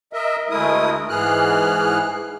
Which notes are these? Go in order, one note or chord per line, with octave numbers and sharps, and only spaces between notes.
A#4 D#5 E5
D2 G#3 A3 E4 A#4 D#6
G#2 E3 G#4 F6 F#6